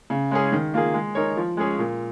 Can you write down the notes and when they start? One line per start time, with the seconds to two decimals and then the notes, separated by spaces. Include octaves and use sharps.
0.10 C#3
0.31 G#3 C#4 G#4
0.52 D#3
0.74 A#3 F4 G#4
0.94 G#3
1.15 D#4 A#4 C#5
1.37 F3
1.57 G#3 C#4 G#4 C#5
1.79 A#2